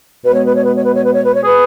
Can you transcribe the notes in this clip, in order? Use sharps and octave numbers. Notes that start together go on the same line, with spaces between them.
B2 G#3 B3 B4
C#5
B4
C#5
B4
C#5
B4
C#5
B4
C#5
B4
C#5
G#4 B4